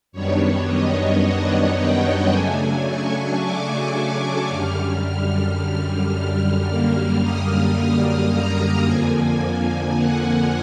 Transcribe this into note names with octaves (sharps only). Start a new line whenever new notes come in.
F#2 D#3 G3 B3 D4 C#5
D#5
F#5
G5
C#3 F#3 A3 D4 G#5
C#6
D6
F#2 D3 G3 F6
F6
F#2 D3 G3 A#3 F6
D#6
A#5
F2 D3 F3 A#3 G#5
G#5
F#5